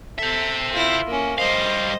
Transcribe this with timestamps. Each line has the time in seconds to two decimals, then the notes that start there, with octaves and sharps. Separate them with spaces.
0.19 A4 C5 E5
0.73 E4 F4
1.06 A#3 C#4
1.38 G3 C5 D#5 F5